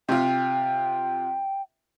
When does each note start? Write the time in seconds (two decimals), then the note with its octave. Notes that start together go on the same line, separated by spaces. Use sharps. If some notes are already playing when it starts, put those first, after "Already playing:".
0.09 C3 F4 G5